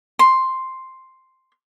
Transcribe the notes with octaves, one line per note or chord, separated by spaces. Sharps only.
C6